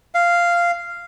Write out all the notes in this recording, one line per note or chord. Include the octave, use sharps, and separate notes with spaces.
F5